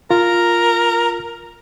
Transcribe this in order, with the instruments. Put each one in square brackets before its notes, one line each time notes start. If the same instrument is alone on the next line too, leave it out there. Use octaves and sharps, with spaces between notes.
[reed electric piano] F4 [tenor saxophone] A#4